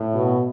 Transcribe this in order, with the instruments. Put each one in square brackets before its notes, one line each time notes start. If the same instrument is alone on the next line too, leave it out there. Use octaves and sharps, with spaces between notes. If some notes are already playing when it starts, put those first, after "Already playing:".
Already playing: [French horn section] A2
[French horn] B2